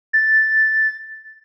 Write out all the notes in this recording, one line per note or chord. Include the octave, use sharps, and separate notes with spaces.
A6